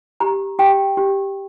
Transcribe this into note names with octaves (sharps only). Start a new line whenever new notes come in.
G4 A#5
G4 G5
G4